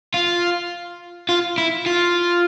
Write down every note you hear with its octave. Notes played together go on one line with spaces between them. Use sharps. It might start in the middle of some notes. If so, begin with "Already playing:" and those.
F4
F4
E4
F4